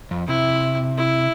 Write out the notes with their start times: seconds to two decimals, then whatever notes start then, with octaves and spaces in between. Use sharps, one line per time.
0.11 F2
0.28 C3 E4
0.97 E4